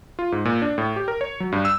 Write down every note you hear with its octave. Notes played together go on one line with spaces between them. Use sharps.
F4
G#2
A#2
D4
A2
G4
A#4
C#5
F#3
G2
E6